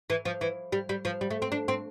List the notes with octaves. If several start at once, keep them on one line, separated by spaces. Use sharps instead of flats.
E3
F3
E3
G3
G3
F3
G3
A3
C4
D4
C4